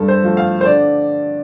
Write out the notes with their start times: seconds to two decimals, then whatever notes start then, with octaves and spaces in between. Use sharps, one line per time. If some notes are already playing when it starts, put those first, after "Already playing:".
Already playing: G2 A4
0.08 C5
0.23 F3 A3 F4
0.37 F5
0.61 C5
0.65 D3 D5